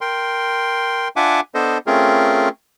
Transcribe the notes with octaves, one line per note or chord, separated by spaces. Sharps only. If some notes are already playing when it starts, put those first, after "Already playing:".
A#4 G5 C6
D4 F4 E5 F#5 G#5 D6
B3 D4 A4 C5 D#5
A3 C4 C#4 F4 G#4 A#4